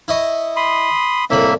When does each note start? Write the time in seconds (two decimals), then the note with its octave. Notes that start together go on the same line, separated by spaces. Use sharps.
0.08 E4 D#5 C#6
0.56 B5 C6 D#6
1.30 C2 A2 A#3 E5 B5